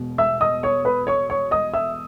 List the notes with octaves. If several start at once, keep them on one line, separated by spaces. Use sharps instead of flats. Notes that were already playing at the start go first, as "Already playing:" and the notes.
Already playing: E1 B2
E5 E6
D#5 D#6
C#5 C#6
B4 B5
C#5 C#6
C#5 C#6
D#5 D#6
E5 E6